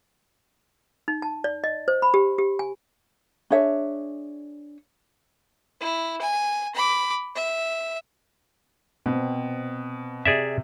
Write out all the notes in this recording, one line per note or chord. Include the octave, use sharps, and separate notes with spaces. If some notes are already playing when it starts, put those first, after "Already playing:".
D#4
A5
D5
D#5
C5
B5
G4
G4
G#5
D4 G#4 C#5 E5
E4
G#5
B5 D6
E5
B2 C4
C3 G#4 D5 E5